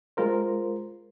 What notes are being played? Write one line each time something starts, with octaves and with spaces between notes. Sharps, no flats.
G#3 F4 A#4 C5